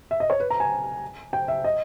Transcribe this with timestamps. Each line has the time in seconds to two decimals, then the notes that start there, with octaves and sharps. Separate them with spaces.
0.11 E5
0.20 D#5
0.30 C#5
0.40 B4
0.50 A#5
0.60 G#5
1.33 G5
1.48 E5
1.64 D#5